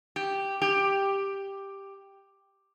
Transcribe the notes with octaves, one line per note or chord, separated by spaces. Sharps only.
G4
G4